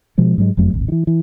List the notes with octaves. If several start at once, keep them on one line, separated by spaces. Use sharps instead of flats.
B2 F3 G#3
G#2 F#3 G#3
F#1 F2 F#3 A3
D1 G#1
D#3 E3
E3